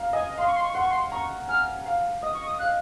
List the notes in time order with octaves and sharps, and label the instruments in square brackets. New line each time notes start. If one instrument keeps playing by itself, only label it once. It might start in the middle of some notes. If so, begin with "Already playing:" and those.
Already playing: [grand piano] F5 A#5
[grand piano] D#5 [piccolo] G#5
[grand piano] F5 [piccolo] C6
[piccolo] C#6
C6
C#6
[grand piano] F#5 [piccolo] C6
[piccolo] C#6
C6
[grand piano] A#5 [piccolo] C#6
[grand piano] G#5 [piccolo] F6
[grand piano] F5
[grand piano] D#5 [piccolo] D#6
[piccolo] C#6
D#6
[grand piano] F5 [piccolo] F#6